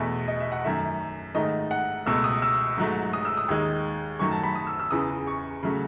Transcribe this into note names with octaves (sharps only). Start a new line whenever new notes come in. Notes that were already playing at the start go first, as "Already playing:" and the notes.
Already playing: E2 B2 A3 E5
D#5
E5
F#5
F#2 D#3 A3 E5
G#2 D#3 A3 D#5
F#5
C#2 B2 A3 E6
D#6
E6
G#2 F#3 A3
D#6
E6
D#6
D#2 D#3 G#3
F#2 D#3 F#3 A3 C#6
A5
B5
D#6
E6
E6
E2 C#3 E3 D#6
C#6
C#3 F#3 A3